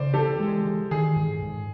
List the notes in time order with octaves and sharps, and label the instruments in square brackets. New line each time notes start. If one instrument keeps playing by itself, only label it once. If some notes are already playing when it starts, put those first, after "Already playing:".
Already playing: [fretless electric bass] C#3 [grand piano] C5 D5
[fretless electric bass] E3 [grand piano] G4 A4
[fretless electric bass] G#3
E3
[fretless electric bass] D#3 [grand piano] G#4
[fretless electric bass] G#2
G#2